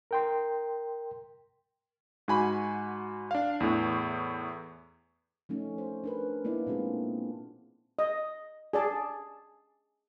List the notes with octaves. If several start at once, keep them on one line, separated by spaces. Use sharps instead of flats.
A#4 G5 C6
G#2 F#4 G#5 B5
D4 F5
E2 A2
F3 A3 C#4 D#4
C5
D4 A#4 B4
A#3 B3 D#4 E4 D5
A#2 G#3 C4 D4 F4 G#4
D#5
G#4 D5 A5